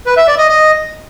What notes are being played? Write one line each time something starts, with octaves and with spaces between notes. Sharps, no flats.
B4
E5
D5
D#5
D#5